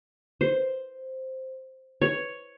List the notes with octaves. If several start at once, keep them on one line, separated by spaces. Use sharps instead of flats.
C5
C#5